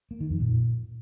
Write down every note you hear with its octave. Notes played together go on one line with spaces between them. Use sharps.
A#3
D#3
F2
A#2